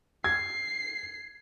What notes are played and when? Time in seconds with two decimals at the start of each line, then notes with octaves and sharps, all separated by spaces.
0.24 G#6 C7